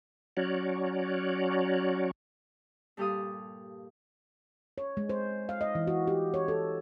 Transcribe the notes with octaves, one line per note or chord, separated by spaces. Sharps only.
F#3 C#4 F#4 C#5 D5
G2 A#2 G4 A4 F5 D#6
C#5
G#3
C5
F5
D#5
E3
F#4
G4
C#5
A4